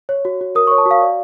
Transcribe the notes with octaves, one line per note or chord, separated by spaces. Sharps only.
C#5
F#4
F#4
A#4 D#6
C#6
C#5
A5
F#4
F5
D5